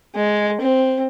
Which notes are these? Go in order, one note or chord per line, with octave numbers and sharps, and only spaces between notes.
G#3
C4